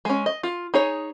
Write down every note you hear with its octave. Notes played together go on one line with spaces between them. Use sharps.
G#3 C#4
D#5
F4
D#4 G#4 C#5